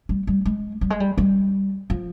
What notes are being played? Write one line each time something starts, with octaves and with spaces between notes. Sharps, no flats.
G3
G3
G#3
G3
G#3
G3
G3
F3